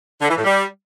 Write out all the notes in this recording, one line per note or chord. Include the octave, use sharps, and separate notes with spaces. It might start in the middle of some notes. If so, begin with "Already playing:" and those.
D3
E3
A2
G3